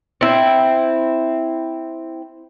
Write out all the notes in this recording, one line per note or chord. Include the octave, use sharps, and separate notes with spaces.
C4 E4